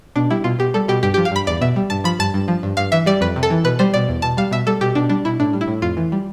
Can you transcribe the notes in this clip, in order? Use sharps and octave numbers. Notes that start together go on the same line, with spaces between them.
B2 D4
G3 E4
B2 F4
B2 G4
G3 A4
B2 G4
G2 G4
F3 G4
F5
G2 B5
E2 D5
B2 E5
G3
G2 A5
F3 B5
G2 A5
G2
F3
G2
G2 F5
E3 E5
G3 D5
F2 B4
C3
A4
E3
B2 B4
G3 C5
B2 D5
E2
B2 A5
G3 F5
B2 E5
G3 A4
B2 G4
B2 D4
G3 D4
B2 E4
A2 D4
G3
E4
A2
F2 F4
E3
G3